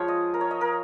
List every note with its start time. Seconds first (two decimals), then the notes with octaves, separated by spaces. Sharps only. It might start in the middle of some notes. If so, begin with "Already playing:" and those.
Already playing: F3 G#3 F4 C#5
0.08 D#5
0.34 A#4
0.41 C#5
0.51 D#5
0.61 A#4